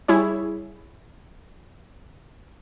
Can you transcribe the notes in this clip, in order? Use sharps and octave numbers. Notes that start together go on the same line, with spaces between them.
G3 E4 G#4 C#5